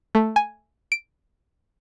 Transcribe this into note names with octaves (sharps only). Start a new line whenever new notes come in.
A3
G#5
D7